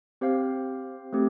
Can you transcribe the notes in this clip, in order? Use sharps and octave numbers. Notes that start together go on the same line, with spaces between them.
C4 G4 C5 F5
A3 C4 G4